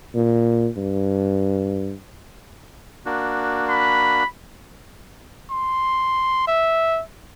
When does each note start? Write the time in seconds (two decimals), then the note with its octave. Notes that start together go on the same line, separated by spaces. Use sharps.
0.15 A#2
0.77 G2
3.06 A#3 D4 F#4
3.70 B5
5.50 C6
6.48 E5